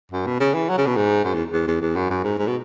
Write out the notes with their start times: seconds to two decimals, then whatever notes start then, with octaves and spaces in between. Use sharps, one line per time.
0.12 F#2
0.26 B2
0.40 C#3
0.54 E3
0.69 F#3
0.78 C#3
0.87 B2
0.96 G#2
1.24 F#2
1.34 E2
1.53 E2
1.67 E2
1.82 E2
1.96 F#2
2.10 F#2
2.24 G#2
2.38 G#2
2.47 B2